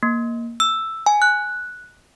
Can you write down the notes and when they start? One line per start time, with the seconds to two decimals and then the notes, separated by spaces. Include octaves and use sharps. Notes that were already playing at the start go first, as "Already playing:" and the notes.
0.03 A#3
0.60 E6
1.06 G#5
1.22 F#6